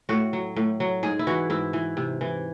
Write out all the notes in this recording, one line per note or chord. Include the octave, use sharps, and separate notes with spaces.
A2 F#4
F#3
A2
F#3
G#2 G#4
E4
E3 F#4
G#2 E4
E3
C3
E3